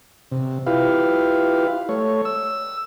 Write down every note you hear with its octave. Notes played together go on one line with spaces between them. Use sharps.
C3
E4 F4 G4 B4 F5
A3 C#5
E6